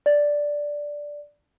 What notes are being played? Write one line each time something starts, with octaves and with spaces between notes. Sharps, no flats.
D5